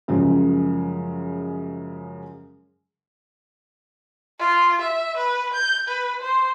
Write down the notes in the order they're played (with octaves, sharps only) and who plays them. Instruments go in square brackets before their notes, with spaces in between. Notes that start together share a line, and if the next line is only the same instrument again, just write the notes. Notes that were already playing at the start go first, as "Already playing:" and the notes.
[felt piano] F#2 C#3 F3 G#3
[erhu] F4
E5
B4
G6
B4
C5